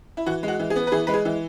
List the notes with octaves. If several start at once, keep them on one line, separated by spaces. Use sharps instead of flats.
E4
E3 F#4
G#3
F#4
E3
G#4
B3
B4
E3 G#4
G#3 B4
G#4
E3